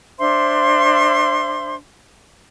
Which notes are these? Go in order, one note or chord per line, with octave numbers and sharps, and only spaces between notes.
D4 C5 E5 C6